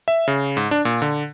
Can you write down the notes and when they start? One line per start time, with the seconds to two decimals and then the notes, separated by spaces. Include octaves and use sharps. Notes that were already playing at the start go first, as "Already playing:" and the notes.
0.08 E5
0.28 C#3
0.57 G#2
0.71 D4
0.85 A#2
1.02 D3